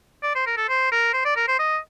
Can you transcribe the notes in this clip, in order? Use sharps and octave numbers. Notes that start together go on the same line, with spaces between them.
D5
C5
A#4
A4
C5
A#4
C5
D5
A#4
C5
D#5